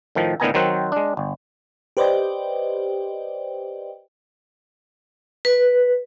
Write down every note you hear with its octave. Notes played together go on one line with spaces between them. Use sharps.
A2 D#3 F3
A2 D3 D#3 B3 G#5 A#5
D#3 F#3 C4 C5 F#5
G#3 D4
G1
G4 B4 C5 D5 D#5 G5
B4